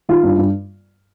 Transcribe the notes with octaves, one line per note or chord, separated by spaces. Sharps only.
D#3 F4
G2
G2